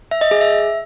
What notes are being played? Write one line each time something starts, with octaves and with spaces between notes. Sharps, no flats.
E5
D#5
G#4
E5